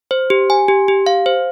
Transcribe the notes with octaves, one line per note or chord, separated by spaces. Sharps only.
C5
G4
G#5
G4
G4
F5
C5